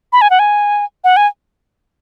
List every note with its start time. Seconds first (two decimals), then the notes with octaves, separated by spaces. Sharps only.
0.13 B5
0.21 G#5
0.30 F#5
0.39 G#5
1.04 F#5
1.17 G#5